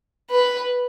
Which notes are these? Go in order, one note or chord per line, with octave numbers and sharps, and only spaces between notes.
B4